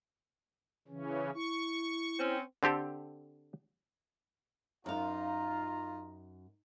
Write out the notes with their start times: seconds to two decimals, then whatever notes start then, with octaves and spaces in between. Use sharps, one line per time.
0.88 C#3 E3 C#4
1.35 E4 C#6
2.19 C4 C#4
2.63 D3 C4 G4 A4
4.86 F#2 D#4 F4 F5 A#5